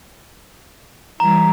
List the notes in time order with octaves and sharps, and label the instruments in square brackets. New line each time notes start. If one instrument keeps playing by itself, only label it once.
[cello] E3 G3 [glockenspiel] A#5